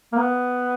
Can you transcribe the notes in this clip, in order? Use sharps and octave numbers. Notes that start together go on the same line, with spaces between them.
A#3
B3